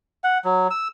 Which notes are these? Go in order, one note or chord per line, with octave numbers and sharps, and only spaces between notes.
F#5
F#3
E6